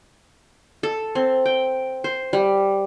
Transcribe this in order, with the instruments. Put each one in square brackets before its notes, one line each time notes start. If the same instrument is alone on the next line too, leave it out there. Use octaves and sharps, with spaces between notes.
[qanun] A4
C4
G5
C5
G3